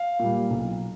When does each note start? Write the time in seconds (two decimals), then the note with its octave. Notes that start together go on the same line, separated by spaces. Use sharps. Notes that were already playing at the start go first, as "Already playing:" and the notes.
Already playing: F5
0.19 A#2
0.24 G3
0.50 B1